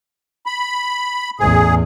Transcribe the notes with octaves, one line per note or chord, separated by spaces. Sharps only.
B5
A1 E2 G#4